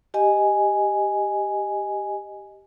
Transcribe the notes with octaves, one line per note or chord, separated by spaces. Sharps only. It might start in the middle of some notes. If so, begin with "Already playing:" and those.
G4 D#5 G#5